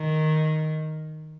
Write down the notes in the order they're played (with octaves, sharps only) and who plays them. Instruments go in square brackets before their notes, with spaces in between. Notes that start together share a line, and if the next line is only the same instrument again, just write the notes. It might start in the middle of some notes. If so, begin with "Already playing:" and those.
Already playing: [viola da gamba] D#3